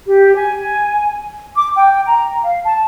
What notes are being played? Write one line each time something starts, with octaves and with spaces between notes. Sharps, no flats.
G4
G#5
D6
G5
A#5
F5
A5